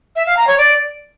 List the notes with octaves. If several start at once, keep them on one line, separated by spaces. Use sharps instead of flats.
E5
F5
A#5
C#5
D5